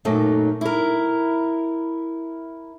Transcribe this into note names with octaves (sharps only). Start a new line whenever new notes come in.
F#2 A#2 F#3 A3 D#4
E4 A#4